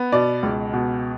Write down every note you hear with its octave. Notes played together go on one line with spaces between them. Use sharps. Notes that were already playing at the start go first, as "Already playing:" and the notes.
Already playing: B3
B2 D5
C#2
B2